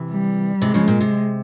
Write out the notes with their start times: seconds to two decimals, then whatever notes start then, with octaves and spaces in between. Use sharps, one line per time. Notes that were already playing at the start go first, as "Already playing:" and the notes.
Already playing: C3 E3
0.11 G3
0.62 C3 E3 G#3
0.74 C#3 F3
0.88 A#2
1.01 C3